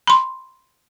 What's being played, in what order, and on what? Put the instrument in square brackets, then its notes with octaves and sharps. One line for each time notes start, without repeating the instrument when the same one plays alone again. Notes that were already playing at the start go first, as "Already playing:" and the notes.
[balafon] B5 C6